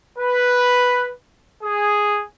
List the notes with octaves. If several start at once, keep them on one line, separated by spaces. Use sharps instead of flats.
B4
G#4